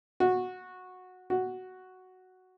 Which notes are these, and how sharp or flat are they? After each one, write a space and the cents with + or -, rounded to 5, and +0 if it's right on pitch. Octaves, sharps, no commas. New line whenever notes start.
F#4 -10
F#4 +5